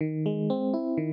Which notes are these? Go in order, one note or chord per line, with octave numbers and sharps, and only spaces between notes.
D#3
G#3
C4
E4
D#3